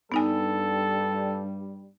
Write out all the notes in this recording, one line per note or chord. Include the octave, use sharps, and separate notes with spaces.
G2 G3 B3 D#4 A4 G#5